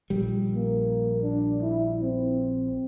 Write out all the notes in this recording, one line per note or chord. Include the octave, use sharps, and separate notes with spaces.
A#1 G3
A#3
D4
E4
C4